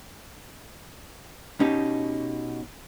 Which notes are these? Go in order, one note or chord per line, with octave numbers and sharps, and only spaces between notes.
B2 C#4 D#4 G4